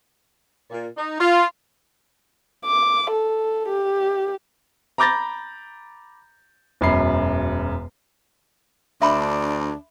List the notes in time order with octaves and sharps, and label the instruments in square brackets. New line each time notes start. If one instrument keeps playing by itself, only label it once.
[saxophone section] A#2
D#4
F4
[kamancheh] D6
A4
G4
[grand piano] A#5 B5 D6 G6 A6 A#6
E1 F#2 B5 C7
[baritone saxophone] D2 [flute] D4 [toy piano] E5 B5 C6